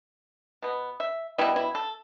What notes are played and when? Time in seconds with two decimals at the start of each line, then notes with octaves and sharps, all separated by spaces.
0.62 B2 B3
1.00 E5
1.38 B2 G3 B3 E4
1.56 E4
1.75 A4